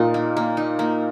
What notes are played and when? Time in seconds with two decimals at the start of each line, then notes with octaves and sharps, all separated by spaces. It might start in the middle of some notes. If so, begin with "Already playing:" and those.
Already playing: A#2 D#4 F4
0.14 A#3
0.37 A#3
0.57 D#4
0.79 A#3